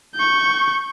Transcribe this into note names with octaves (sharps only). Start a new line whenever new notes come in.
C#6 G6